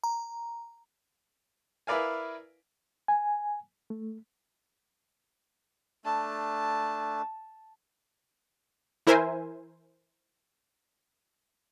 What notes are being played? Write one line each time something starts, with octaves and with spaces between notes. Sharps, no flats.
A#5
E4 A#4 B4 D5 F5 G#5
G#5
A3
A3 D4 A5
E3 E4 A#4 C5 E5 G#5